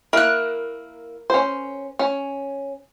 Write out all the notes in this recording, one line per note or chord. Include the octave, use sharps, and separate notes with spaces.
A#3 E4 A#4 F#6
C#4 C5
C#4